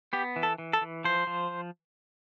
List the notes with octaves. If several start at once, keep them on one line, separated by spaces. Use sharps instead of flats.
B3 G4
E3
A4
E3
A4
E3
F3 C5
F3